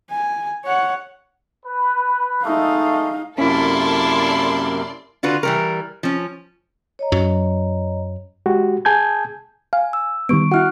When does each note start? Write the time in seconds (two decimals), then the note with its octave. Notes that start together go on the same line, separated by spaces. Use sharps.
0.10 G#5
0.65 C#5 F#5
1.65 B4
2.44 G#3 A3 D#4 F5
3.38 F#2 C3 A#3 C#4 E4 A4 D5 C6
5.23 D3 D4 F4 F#4 B4
5.43 E3 G3 A#4
6.03 F3 C#4
6.99 C#5 D#5 A#5
7.12 F#2 F#3
8.46 G#3 F#4 G4
8.85 G#4 G#5 A5 G6 G#6
9.73 F5 G#5
9.93 E6
10.29 D#3 G3 B3 C#6 D7
10.51 E4 F#4 F#5 F6 F#6